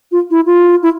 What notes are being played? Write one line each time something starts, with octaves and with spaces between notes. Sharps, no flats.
F4
E4
F4
E4